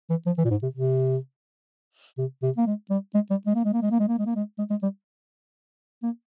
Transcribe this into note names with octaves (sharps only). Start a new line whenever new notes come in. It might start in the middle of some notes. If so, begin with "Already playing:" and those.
E3
F3
E3
A#2
G#2
C3
C3
C3
C3
A#3
G#3
G3
G#3
G3
G#3
A#3
G#3
A#3
G#3
A#3
G#3
A#3
G#3
A#3
G#3
G#3
G#3
G3
A#3